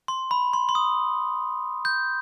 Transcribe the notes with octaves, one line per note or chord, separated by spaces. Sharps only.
C6
B5
C6
C6
D#6
G6